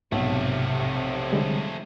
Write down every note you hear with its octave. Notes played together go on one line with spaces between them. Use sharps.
B1 G#2 C3 F3 A3
D3 G3 G#3